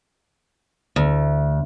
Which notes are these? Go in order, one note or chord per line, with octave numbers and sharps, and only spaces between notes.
D2